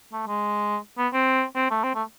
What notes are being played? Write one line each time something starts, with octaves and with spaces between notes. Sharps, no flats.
A3
G#3
B3
C4
C4
A3
C4
A3